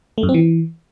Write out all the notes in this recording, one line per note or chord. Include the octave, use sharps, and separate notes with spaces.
A3
F#2
C4
E3